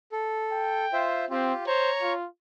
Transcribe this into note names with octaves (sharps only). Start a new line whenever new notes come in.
A4
G5
F4 C5 E5
C4 F4 G4
C5 C#5 A#5 C#6
F4